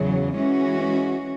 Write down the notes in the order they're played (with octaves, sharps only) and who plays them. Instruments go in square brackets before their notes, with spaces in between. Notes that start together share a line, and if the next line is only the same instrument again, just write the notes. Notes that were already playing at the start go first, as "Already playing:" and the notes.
Already playing: [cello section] E2 C#3 F#3
E3 G#3 C#4 F#4